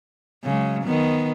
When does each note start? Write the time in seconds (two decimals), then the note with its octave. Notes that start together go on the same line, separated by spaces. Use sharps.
0.44 C#3 F#3 G#3
0.84 D#3 B3